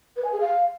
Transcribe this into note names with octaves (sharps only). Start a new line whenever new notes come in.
B4
G#5
G#4
F5